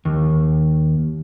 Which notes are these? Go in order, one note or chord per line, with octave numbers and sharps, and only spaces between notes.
D#2